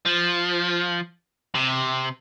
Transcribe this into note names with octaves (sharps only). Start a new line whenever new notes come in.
F3
C3